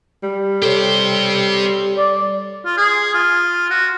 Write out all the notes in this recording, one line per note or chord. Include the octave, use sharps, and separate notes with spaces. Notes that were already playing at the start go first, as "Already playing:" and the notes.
G3
G4 A4 C5 C#5
D5
F4
G#4
F4
F#4